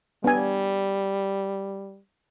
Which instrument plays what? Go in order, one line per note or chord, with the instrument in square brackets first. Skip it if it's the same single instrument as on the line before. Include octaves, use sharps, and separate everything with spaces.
[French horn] G3 [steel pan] B3 D4 G#5